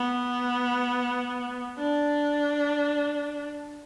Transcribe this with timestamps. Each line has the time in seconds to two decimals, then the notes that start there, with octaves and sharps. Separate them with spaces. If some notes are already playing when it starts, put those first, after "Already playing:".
Already playing: B3
1.78 D4